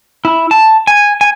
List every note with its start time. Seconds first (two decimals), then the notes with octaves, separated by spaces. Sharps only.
0.25 E4
0.51 A5
0.87 G#5
1.21 G#5